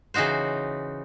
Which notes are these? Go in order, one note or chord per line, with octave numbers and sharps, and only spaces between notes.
C#3 E3 D#4 F#4 C5